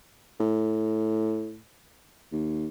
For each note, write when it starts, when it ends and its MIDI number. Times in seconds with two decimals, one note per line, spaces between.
0.40 1.59 45
2.32 2.67 39